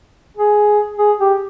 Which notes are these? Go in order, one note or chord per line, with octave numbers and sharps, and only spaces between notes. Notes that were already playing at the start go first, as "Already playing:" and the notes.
G#4
G#4
G4